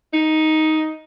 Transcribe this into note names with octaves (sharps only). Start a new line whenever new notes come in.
D#4